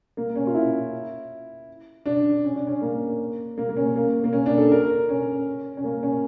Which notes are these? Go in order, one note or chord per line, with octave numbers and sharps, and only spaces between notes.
A#3
C#4
F4
E4
D4
C#4
D4
C#4
A#3
A#3
A#3
C#4
A#3
A#3
C#4
D4
A4
A#4
C#4
C#4
A#3
C#4